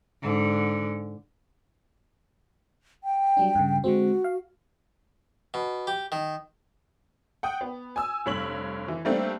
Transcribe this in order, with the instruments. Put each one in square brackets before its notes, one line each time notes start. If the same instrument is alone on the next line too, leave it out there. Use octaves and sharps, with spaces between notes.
[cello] G#2 D3
[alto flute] G5
[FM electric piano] F#3 G3 D4
G2 C#3
[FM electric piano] D3 G#3 C4 [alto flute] F#4
[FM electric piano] F5
[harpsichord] B2
G4
D#3
[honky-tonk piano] F#5 G5 D#6
B3
G#5 D#6 E6
F1 G2 C#5 B6 F#7
E3
G3 A3 A#3 C4 D4 A4